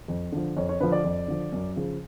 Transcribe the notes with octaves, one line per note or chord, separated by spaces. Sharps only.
F2
D3 F3
F2 C#5
C#5
D3 F3 B4
D5
F2
D3 F3
F#2
C#3 F3